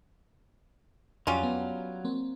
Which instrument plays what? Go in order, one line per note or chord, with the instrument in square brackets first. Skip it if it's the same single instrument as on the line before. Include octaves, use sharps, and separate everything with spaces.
[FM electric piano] F2 [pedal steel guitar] F#3 A#5 [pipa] G3 C#4 F4
[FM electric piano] B3
A#3 C4